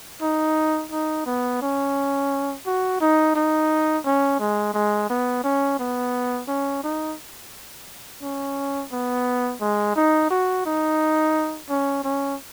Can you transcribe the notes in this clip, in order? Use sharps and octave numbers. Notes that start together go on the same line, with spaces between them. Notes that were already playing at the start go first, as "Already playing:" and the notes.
D#4
D#4
B3
C#4
F#4
D#4
D#4
C#4
G#3
G#3
B3
C#4
B3
C#4
D#4
C#4
B3
G#3
D#4
F#4
D#4
C#4
C#4